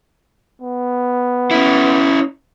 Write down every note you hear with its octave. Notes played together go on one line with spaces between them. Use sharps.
B3
C#4 E4